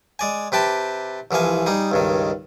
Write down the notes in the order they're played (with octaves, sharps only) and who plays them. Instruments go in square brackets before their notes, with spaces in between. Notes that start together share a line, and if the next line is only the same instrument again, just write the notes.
[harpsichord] G#3 D5 G#5
C3 G4 B4 G5 A5
C2 E3 F3 F5 G#5
G3 D#4 G#4
C#2 G2 D#3